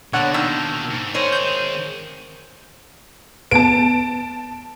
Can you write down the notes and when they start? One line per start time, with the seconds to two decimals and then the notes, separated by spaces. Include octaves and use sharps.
0.13 B2 D3 A#3 B3 C#5 F#5
0.34 D#3 E6
0.90 G#2
1.14 D#3 G#4 A#4 C5 C#5
1.32 G6
3.51 B3 B4 A5 D7